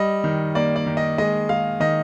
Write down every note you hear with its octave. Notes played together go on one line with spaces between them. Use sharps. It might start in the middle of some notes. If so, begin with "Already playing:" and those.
Already playing: G3 D#5
D#3
A#3 D5
D5
D#3
D#5
G#3 D#5
G#3 F5
D#3 D#5